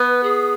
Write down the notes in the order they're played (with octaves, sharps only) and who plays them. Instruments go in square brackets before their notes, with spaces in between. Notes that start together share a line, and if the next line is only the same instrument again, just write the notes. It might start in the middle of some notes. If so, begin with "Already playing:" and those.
Already playing: [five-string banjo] B3 [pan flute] B4
[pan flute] G#4